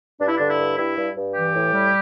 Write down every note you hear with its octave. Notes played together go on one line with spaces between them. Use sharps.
G2 D4
E4
D3 D4
E4
G2
G2 E4
G2
G2
E3 G4
A2
G3